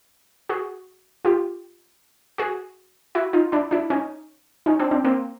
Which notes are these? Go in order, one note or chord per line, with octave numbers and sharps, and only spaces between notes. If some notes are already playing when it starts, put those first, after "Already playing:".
F#4 G#4
F4 G4
F#4 G#4
E4 F#4
D#4 F4
D4 E4
D4 E4
C#4 D#4
C#4 D#4
C4 D4
C4 D4
A#3 C4